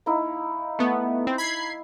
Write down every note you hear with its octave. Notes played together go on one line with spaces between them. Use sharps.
A#3 D#4 E4
A3 B3
C4
B5 G#6 C7